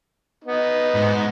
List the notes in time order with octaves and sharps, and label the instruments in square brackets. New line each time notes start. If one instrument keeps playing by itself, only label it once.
[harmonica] B3 D#4
[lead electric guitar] G#2